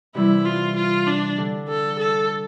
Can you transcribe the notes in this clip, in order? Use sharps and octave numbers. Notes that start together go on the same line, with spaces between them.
C3 E3 G3 E4
F4
F4
D4
D3 G3 D4
A4
A4